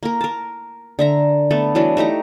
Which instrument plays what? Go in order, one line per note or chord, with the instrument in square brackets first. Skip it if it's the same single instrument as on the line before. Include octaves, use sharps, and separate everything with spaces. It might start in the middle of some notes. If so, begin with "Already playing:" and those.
[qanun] A#3 A#4
A#4 A5
D3 E5 A#5
A3 B3 A4
E3 F#3 D4
A3 D#4 G4 A#5